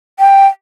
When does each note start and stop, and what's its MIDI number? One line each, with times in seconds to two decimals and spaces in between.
0.19 0.47 79